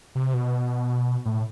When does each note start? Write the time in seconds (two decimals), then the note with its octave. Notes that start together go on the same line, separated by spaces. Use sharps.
0.15 C3
0.34 B2
1.25 A2